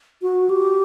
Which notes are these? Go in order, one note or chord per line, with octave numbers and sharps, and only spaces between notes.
F#4
G4